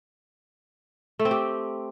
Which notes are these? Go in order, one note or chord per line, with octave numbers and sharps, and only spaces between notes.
A3
C4
G4